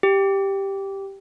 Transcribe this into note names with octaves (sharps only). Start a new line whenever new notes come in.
G4